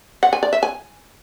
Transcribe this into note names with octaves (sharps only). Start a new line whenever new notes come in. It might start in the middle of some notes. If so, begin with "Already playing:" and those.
F#5
G#5
D5
E5
G#5